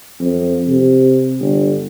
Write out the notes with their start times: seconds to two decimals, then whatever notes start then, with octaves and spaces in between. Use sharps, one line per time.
0.20 F2
0.67 C3
1.40 G1